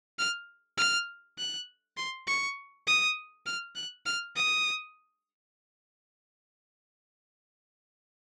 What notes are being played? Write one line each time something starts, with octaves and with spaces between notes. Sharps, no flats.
F6
F6
F#6
C6
C#6
D#6
F6
F#6
F6
D#6